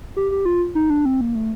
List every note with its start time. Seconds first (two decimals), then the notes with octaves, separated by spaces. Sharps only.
0.16 G4
0.31 G4
0.45 F4
0.75 D#4
0.90 D4
1.05 C4
1.21 A#3
1.35 A3